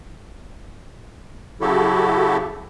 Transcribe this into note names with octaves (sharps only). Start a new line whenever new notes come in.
C#3 F#3 E4 F#4 G4 A4